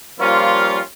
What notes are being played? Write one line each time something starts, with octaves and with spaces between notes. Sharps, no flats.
F3 G3 A#3 C#4 F4